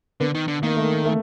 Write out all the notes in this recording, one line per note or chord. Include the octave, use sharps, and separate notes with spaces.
D3 B3
D#3
D3
D#3 A#3
A3
A3